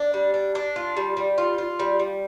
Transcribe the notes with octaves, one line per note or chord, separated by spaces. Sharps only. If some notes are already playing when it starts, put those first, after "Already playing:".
Already playing: D4
G3
D4
D4
F4
G3
G3
F4
F4
G3
G3